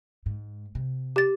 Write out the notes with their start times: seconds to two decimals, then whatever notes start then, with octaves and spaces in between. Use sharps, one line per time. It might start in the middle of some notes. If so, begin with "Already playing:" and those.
0.26 G#2
0.75 C3
1.16 G4 A6